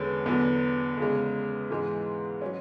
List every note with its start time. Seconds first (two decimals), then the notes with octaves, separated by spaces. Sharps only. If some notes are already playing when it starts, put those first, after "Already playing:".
Already playing: E2 D3 G#3 B3 C#4
0.26 E2 D3 F#3 B3
0.97 E2 C#3 G#3
1.70 G#2 E3 G#3
2.42 F#3 C#4